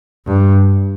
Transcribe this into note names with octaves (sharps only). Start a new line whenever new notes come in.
G2